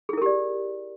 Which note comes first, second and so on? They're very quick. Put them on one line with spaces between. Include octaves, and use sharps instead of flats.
G#4 E4 A#4 G4 D5